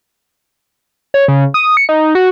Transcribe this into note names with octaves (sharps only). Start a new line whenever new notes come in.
C#5
C#3
D#6
C#7
D#4
F#4